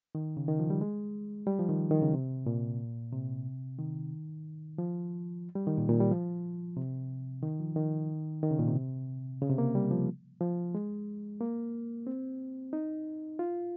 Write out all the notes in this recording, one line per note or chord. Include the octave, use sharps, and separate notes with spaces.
D#3
C#3
D#3
F3
G3
G#3
G3
F3
D#3
D#3
C#3
C3
A#2
C3
D#3
F3
G3
D#3
A#2
A#2
G3
F3
C3
D#3
F3
D#3
D#3
C#3
A#2
C3
C#3
C3
A#3
G3
F3
F3
G#3
A#3
C4
D#4
F4